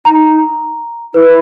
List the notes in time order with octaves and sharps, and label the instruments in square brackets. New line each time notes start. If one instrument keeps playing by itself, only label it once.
[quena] D#4 [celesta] A#5
[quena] E4 [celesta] B4